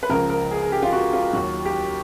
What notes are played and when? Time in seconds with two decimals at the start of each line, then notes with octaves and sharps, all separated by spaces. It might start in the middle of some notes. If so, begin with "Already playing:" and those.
0.03 B4
0.09 C#2 C#3 F3 A#4
0.30 A#4
0.51 G#4
0.62 G#4
0.72 G4
0.83 F4
0.93 F#4
1.13 F4
1.33 D#2 D#3 F#3 F#4
1.65 G4